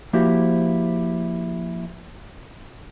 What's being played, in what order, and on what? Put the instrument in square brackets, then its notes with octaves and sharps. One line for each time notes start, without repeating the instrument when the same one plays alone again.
[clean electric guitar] F3 A#3 E4 F#4 G4 C5